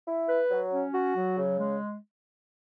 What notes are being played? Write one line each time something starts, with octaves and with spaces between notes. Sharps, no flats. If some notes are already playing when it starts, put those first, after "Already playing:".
E4
B4
F#3
C#4
F#4
F#3
C#3
G#3